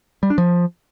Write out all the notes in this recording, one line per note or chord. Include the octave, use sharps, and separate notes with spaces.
G3
D4
F3